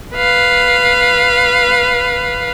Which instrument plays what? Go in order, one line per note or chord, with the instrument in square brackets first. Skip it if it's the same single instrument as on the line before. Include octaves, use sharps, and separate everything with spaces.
[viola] B4 F5